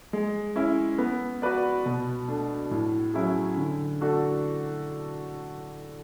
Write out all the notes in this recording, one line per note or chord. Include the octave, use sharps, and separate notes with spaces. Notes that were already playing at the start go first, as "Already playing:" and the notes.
G#3
C#4 E4
B3
F#4 B4 D5
B2
A3 D4
A2
F#3 C#4 E4 G#4
D3
A3 D4 F#4 A4